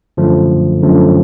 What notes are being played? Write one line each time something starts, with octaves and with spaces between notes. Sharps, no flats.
F#2 D3 F3 A3
F#2 D3 F3 A3